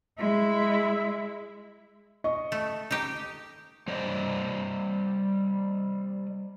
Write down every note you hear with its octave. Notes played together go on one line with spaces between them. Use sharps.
G#3 E4
D#5 C#6
A3
D#4 G4
G3 C5 D5 D#5